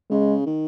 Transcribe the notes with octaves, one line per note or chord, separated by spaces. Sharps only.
C#3 G#3
D#3